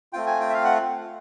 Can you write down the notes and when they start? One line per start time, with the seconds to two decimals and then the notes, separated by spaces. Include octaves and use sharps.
0.13 A3 C4 F4 G5
0.27 G#5
0.40 G5
0.49 E5
0.54 F5
0.64 F#5